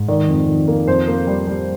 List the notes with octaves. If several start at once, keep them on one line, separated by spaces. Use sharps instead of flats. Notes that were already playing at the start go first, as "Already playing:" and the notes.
Already playing: G#2
D#3 D5
F2
D#3
A#3
F2 C5
A#3
G3
G3